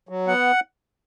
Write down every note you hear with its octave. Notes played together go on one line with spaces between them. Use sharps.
F#3
B3 F#5